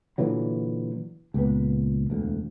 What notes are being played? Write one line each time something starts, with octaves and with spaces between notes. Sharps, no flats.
A#2 D3 E3 F#3
C#2 A#2 B3
E1 D2